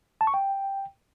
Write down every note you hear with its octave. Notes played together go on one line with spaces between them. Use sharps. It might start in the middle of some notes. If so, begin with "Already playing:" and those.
A5
C#6
G5